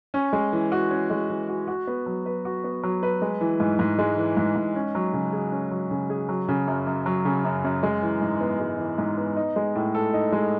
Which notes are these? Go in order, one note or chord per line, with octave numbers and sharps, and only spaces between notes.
C#4
G#3
E3
F#4
C#4
G#3
E3
F#4
F#4
B3
F#3
B4
F#4
B3
F#3
B4
G#3
E3
G#2
G#2
G#3
E3
G#2
G#2
C#4
F#3
C#3
G#4
C#4
F#3
C#3
G#4
F#3
C#3
F#2
F#2
F#3
C#3
F#2
F#2
G#3
E3
G#2
B3
G#3
E3
G#2
B3
D#4
G#3
A2
A4
D#4
G#3